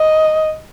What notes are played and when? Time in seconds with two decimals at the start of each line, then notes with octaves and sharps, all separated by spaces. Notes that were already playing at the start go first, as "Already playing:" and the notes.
Already playing: D#5